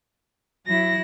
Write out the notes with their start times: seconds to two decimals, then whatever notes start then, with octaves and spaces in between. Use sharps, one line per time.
0.66 F#3 E4 A#6